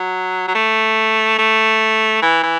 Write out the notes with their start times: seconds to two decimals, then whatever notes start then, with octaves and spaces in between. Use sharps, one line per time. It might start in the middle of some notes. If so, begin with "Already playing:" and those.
Already playing: F#3
0.48 F#3
0.55 A3
1.39 A3
2.22 E3
2.43 E3